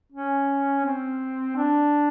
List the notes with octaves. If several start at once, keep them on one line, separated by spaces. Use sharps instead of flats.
C#4
C4
D4